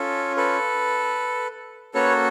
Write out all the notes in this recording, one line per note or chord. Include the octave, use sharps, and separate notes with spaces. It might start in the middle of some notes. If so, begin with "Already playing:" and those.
Already playing: C#4 F4 A4
A4 B4
A#3 C#4 F#4 A4 B4 C#5